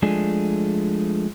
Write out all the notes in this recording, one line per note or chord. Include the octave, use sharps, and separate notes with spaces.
F3 G#3 A3 D4 G#5